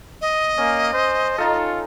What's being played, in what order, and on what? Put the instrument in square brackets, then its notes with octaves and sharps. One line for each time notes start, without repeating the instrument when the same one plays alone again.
[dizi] D#5
[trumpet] A#3 [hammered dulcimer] C#4
[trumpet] C5
[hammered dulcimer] D#4 A4 [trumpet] F4